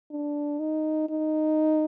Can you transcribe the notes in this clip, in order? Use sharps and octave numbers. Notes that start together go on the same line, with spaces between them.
D4
D#4
D#4